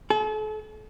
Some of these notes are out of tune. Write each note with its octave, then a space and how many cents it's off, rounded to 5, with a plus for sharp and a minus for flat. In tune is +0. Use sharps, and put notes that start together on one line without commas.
A4 -40